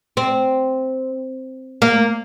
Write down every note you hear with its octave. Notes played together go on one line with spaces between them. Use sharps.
C4
A#3